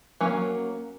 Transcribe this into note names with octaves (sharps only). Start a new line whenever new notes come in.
F#3 A#3 C#4